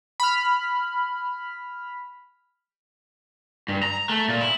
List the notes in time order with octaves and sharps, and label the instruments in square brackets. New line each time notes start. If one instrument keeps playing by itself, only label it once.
[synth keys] B5 F6
[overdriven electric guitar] G2
A#5
A3
A#2
E4